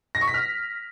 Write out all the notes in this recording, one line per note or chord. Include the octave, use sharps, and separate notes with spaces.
A#6
C#6
B6
F6